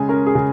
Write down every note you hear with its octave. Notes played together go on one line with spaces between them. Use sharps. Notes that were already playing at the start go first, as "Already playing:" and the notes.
Already playing: C#3 G#3 G#5
C#4 A#4
G#4
C#3